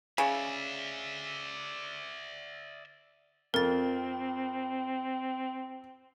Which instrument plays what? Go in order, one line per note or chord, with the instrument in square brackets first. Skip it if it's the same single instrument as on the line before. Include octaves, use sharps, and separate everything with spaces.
[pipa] C#3 [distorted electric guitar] D5 E5
[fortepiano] F2 [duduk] C4 [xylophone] A#4 A6